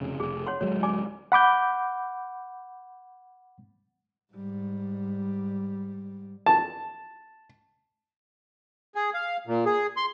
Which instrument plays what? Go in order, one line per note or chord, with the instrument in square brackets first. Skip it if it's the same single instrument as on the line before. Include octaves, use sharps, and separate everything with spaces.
[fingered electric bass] F1 C#3
[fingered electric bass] F1 [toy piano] G#4
[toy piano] C#5 F#5 C6
[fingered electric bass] D1 F#3 G#3 [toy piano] C#5
[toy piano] D5 G#5 D6
[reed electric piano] F#5 B5 D6 G6
[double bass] G#2 G3
[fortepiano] A5
[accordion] G#4
F5
A#2
G#4
C6